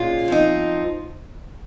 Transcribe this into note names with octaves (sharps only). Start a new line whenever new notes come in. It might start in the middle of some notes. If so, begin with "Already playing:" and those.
Already playing: A#2 G#3 C#4 F4
F3 C4 D#4